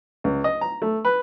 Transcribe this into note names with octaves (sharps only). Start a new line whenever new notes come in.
C#2
D#5
A#5
A3
B4